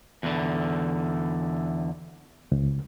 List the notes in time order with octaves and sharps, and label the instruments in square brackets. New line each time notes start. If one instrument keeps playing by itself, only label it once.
[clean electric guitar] E2 D3
[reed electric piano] C#2